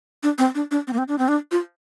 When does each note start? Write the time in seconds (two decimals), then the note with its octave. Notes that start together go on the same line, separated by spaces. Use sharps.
0.23 D4
0.38 C4
0.55 D4
0.71 D4
0.87 C4
0.93 A#3
0.98 C4
1.08 D4
1.18 C4
1.28 D4
1.51 F4